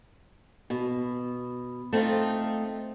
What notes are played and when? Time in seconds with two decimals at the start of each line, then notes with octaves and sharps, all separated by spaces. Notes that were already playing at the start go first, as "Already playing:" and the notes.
0.70 B2
1.93 A3 C4 D#4 F4